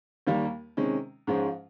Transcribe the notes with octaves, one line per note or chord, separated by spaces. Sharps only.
D#2 D#3 G3 A#3
C3 D#3 G#3 C#4
G#2 F3 G#3 C#4 F4